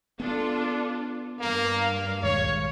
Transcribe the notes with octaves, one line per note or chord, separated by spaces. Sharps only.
B3 D4 F4 A4
G2 A#3 F5
A#1 D#2 G#2 C#5